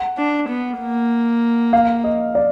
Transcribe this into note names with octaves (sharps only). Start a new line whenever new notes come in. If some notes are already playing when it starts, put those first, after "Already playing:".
Already playing: F#5
D4
B3
A#3
F5
D#5
D5